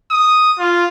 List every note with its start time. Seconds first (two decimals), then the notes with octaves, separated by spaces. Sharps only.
0.11 D#6
0.59 F4